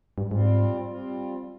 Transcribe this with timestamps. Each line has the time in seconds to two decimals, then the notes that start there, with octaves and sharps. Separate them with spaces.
0.18 G2
0.31 G#2 G3 C4 F4
0.88 G3 C4 F4